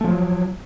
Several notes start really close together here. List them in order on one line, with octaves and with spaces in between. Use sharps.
A3 F3 F#3